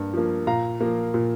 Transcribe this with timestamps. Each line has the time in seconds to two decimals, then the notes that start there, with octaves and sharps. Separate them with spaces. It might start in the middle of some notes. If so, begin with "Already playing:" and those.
Already playing: G2 A#3
0.14 F3 A#3
0.47 A#2 F5 A#5
0.81 F3 A#3
1.14 A#2